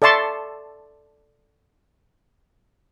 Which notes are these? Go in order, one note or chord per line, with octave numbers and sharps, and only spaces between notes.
A4 D5 E5 A5 C6 C#6